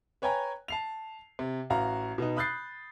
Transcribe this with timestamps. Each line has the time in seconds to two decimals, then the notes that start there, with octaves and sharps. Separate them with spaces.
0.22 B4 C#5 G5 G#5 A#5
0.68 A5 C7 F7
1.39 C3
1.70 A1 F#4 F5 A#5
2.18 B2 B3 D#4
2.36 B5 D#6 F#6 G6 A6 C7